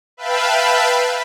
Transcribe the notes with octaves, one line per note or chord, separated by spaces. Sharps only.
B4 E5 F5 G5 A5 B5